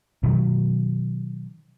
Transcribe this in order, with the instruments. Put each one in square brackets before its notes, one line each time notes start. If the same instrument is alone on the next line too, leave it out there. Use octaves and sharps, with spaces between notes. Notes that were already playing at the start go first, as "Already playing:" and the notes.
[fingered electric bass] B2 D#3 F#3